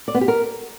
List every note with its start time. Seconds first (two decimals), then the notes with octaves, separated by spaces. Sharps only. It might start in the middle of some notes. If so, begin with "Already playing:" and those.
0.08 D5
0.15 B3
0.21 G4
0.28 A#4